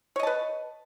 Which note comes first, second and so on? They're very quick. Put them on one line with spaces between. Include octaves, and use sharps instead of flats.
C#5 D#5 A5 B4